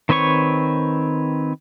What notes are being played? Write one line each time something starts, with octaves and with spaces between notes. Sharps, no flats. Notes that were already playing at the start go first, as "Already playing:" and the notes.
D#3 C4 B4 C#5 C#6